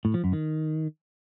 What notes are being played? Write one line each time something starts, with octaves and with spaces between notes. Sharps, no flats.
A2
F3
F#2
D#3